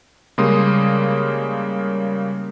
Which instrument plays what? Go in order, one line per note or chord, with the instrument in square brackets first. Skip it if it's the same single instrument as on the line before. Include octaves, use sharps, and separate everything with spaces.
[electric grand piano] C#3 G3 G#3 A#3 C6 D#6